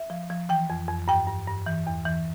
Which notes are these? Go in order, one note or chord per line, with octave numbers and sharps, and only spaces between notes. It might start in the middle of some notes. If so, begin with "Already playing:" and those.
Already playing: E5
F3
F3
E3 G5
F2
F2
G2 G5
G2
G2
E3
E2
E3